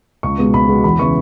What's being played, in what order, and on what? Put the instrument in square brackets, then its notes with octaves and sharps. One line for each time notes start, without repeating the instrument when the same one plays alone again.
[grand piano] C#2 C#6
B2 G#3 B3
C#2 B5
B2 G#3 B3
E2 B5
C#3 E3 B3 C#6